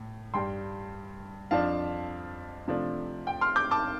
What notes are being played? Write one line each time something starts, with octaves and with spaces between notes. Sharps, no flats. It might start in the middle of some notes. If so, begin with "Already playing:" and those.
Already playing: A2
G2 G3 D4 G5 C6
F2 F3 D4 F5 A5
C3 F3 A3 D4
G5
C6 F6
D6 G6
A5 D6